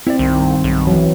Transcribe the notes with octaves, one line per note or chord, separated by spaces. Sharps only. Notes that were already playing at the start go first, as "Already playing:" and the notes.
C4 E4 C#5 D5
C2 G2 D#3
B1
E3 F#3